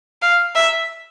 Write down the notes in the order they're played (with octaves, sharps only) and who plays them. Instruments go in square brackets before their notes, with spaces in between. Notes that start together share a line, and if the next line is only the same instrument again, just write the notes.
[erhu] F5
E5